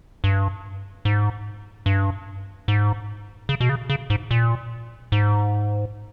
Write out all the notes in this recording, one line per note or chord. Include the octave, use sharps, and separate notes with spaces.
G2
G#2
G2
G#2
C#3
B2
C#3
C#3
G#2
A#2
G#2